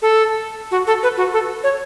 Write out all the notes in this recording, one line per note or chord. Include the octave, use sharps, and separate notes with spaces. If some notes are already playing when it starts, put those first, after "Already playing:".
A4
F#4
A4
B4
F#4
A4
C#5